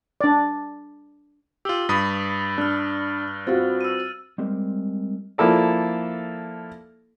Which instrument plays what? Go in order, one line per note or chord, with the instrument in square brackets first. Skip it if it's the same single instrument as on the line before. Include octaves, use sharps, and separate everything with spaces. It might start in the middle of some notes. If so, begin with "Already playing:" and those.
[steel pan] D4 D5
[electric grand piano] F4 G4 [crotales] E6 G7
[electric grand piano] G2 B5 D#6 [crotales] A6
[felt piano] D4 [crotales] F6 F#6
[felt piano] C4 F4 F#4 [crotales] A6
[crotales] E6 D#7
[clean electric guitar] G3 G#3 C4 G4 A#4
[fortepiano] F3 A#3 E4 A4 D5